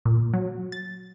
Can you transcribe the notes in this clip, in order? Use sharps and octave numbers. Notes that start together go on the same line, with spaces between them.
A#2
F#3
A6